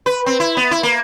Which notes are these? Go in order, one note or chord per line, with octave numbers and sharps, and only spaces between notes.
B4
C4
E4
B3
E4
A#3